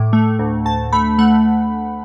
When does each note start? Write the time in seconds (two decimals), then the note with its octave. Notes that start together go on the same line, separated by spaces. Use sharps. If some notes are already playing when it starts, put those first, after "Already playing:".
Already playing: A2 D6
0.13 A3
0.39 D2
0.65 D2 A5
0.92 A3 B5
1.18 A3 F#5